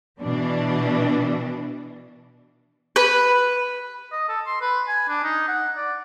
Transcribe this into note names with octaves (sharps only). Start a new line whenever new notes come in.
B2 E3 D4
B4
D#5
A4
C6
B4
G#5
D4
D#4
F#5
D5